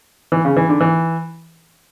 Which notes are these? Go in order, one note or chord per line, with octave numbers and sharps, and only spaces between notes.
E3
C#3
E3
D3
E3